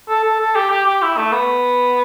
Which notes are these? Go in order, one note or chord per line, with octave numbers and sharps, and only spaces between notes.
A4
A4
A4
G4
G4
G4
E4
A3
B3